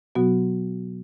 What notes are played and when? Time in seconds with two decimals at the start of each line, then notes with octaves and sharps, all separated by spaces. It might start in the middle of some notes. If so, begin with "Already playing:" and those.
0.15 B2 F#3 B3 F#4